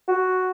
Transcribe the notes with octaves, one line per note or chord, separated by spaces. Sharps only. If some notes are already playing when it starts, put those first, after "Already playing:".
F#4